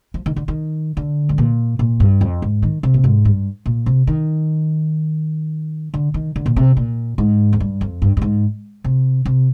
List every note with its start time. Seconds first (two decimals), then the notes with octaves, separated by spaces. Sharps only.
0.14 F3
0.26 D#3
0.36 D3
0.48 D#3
0.97 D3
1.29 G#2
1.38 A#2
1.79 A#2
2.00 G2
2.21 F2
2.42 G#2
2.62 D#3
2.83 C3
2.94 A#2
3.04 G#2
3.25 G2
3.66 A#2
3.86 C3
4.07 D#3
5.94 D3
6.14 D#3
6.36 D3
6.46 A#2
6.56 C3
6.77 A#2
7.18 G#2
7.53 F2
7.60 G2
7.81 F2
8.02 G2
8.17 G2
8.22 G#2
8.84 C3
9.25 C3